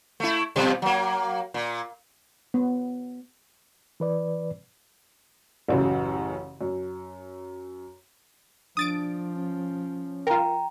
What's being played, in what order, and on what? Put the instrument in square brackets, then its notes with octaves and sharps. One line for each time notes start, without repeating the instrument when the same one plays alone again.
[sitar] A3 E4
F2 B2 G3
F#3 A#3
A#2
[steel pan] B3
[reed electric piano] E3 B4 D5
[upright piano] A1 F#2 C#3
F#2
[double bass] F3 [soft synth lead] D4 [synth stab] D#6 A6 D7
[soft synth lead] C#4
[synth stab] F4 A#4 [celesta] G5 A#5